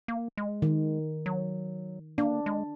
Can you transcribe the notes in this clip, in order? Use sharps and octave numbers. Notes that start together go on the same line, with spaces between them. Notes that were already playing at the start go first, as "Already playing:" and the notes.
A#3
G#3
D#3
F#3
A#3 D4
G#3